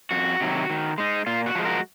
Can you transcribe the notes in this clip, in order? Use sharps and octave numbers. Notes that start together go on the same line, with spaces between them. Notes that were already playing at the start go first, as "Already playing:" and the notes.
F2 F#4
C3 D#3 F#3
D#3
G#3 D#4
A#2 F4
F#4
F3 G#3
F#4 A#4